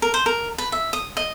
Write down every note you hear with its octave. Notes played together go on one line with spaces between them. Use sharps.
A#4
C5
A#4
B4
E5
D#6
D#5